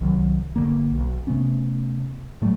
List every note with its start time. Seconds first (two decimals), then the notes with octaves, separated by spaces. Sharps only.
0.01 C2 D#3 F#3
0.56 G1 F2 D3 A#3
0.92 B1
1.27 C3 A3 B3 C#4
2.42 A2 F#3 G3 A3